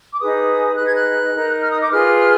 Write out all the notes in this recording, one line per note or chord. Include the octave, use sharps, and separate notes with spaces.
D6
D#4 G#4 B4 D#6
D#4 G#4 B4 F#6
G#6
F#6
D#4 A#4
F6
D#6
D6
F4 G#4 B4 F6